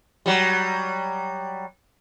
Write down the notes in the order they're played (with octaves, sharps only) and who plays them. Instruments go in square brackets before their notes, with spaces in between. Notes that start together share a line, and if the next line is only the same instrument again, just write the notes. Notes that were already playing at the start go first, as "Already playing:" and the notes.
[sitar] F#3 G3